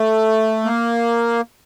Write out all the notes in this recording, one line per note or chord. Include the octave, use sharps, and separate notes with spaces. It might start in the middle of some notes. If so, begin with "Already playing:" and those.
Already playing: A3
A#3